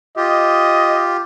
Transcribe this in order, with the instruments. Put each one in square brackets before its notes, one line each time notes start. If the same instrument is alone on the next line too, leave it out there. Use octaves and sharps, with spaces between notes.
[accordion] F4 G4 [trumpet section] D#5